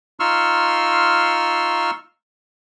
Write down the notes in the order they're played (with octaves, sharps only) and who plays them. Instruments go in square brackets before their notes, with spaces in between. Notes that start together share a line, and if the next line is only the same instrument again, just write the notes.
[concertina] D#4 F4 C6 C#6 E6 F6